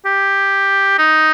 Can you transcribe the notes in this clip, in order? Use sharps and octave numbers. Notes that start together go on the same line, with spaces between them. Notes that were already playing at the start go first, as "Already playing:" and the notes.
G4
D#4